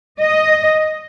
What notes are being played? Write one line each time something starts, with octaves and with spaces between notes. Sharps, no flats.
D#5